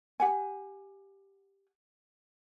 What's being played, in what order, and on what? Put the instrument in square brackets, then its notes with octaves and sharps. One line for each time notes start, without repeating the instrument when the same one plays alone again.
[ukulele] G4 F#5 G#5